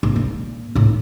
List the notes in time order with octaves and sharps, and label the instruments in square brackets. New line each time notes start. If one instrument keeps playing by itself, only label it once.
[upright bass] A#1
A#2
A2 D#4